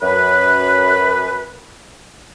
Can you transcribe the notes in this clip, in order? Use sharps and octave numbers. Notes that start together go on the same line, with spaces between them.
F#2 B4